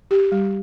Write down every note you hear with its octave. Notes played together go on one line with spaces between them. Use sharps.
G4
G3